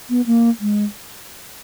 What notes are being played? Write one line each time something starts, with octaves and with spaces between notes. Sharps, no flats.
B3
A#3
G#3